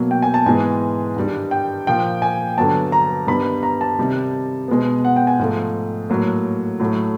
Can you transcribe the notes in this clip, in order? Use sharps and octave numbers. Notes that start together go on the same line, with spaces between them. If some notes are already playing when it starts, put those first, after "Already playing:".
Already playing: B2 F#3 A#3
G5
G#5
A5
G#2 E3 G#3 B3 G#5
G2 D#3 G3
G5
A#2 F3 A#3 G5
G#5
G2 D3 F#3 B3 A5
A#5
G2 D#3 G3 B3 B5
A#5
A5
C3 D#3 G3
B2 G#3 B3
F#5
G5
G#5
G#2 F3 A3
A2 F#3 A#3
A2 F#3 A3